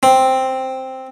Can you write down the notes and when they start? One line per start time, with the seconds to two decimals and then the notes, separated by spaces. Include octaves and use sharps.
0.03 C4